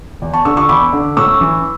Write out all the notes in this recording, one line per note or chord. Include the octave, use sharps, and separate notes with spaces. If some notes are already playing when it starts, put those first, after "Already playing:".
E2
A5 C#6
D3 C#6 E6
C#6 E6
E2 B5 D6
D3
A2 C#6 E6
E3